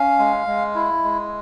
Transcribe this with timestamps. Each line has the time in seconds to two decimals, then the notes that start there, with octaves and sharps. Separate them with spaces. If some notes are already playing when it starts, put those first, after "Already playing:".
Already playing: C#4 F5
0.19 G#3
0.47 G#3
0.75 E4
1.04 G#3